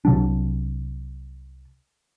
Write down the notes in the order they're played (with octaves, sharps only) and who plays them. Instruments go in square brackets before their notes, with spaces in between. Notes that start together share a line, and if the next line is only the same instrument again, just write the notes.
[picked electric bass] C2 C3 F#3 D4